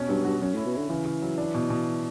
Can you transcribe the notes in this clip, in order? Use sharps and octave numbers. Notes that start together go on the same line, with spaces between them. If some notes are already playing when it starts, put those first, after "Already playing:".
Already playing: B2 C#4
G2 F#3
G2 F#4
F#2 C#4
A2 E4
B2
D3 E4
C#3 E3
C#3
F#3
D4
B2
B2